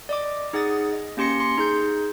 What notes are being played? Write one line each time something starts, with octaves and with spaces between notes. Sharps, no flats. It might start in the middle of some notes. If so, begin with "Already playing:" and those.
D5 D#5 D6
D#4 G#4 F#5 D#6 A6
D#5
A#3 C#4 G4 C6 A#6 C#7
C6
D#4 G#4 G6